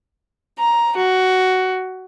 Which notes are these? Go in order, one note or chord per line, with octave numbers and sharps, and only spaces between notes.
A#5
F#4